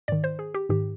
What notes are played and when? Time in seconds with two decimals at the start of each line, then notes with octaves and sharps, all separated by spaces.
0.08 G#2 D#3 D5
0.24 C5
0.39 G#4
0.55 G4
0.69 G#2 D#3 G4